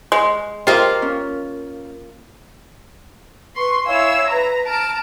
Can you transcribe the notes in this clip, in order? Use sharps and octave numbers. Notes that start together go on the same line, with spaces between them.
G#3
A#3 F4 G4 C5 D#5
C#4
B4 C6 C#6
E4 C#5 F5 G#5 E6
B4 A#5
A5 A#5 F6 D7